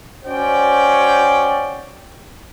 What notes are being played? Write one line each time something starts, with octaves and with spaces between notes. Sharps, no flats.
C#4 F#4 C5 D5 G5